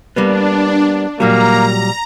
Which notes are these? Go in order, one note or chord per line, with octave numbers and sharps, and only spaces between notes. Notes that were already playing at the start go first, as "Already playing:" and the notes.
G3 A#3 B3 D4
A#2 F#3 G3 A#3 A#5